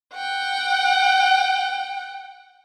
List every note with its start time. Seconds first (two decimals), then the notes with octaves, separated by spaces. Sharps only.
0.13 F#5 G5